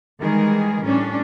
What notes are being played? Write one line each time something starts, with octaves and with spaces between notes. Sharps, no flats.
D#3 E3 G3 G#3 G#4 A#4
A2 G3 C#4 D4